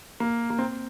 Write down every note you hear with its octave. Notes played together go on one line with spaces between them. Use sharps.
A#3
A#3
C4